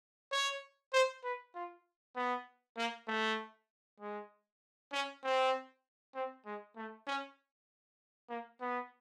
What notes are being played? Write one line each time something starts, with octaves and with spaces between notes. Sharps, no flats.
C#5
C5
B4
F4
B3
A#3
A3
G#3
C#4
C4
C4
G#3
A3
C#4
A#3
B3